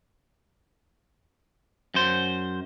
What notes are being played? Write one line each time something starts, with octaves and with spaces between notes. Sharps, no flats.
F#2 C5